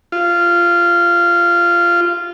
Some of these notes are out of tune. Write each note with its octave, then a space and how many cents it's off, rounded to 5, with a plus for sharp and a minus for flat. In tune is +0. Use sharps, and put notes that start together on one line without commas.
F4 -15